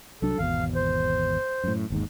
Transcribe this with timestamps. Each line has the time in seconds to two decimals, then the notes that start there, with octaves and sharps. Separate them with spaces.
0.22 C2 F#3 D4 A4
0.39 G#1 E2 B2 F5
0.75 C5
1.64 F#2 A2
1.90 G1 D#2 G#2